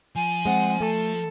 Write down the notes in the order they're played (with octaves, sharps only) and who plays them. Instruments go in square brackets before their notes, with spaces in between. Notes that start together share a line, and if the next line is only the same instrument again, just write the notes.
[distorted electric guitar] F3 [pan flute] G#5
[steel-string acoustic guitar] G#3 C4 [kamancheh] F#5
[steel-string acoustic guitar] A3 [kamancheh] A4